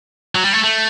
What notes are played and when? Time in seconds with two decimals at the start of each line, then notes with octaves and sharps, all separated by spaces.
0.35 F#3
0.44 G3
0.53 A3
0.64 A3